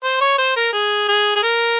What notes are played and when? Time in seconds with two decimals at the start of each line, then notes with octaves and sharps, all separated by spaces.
0.04 C5
0.21 C#5
0.38 C5
0.56 A#4
0.73 G#4
1.08 G#4
1.36 G#4
1.43 A#4